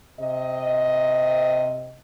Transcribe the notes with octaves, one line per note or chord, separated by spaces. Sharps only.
C3 D#5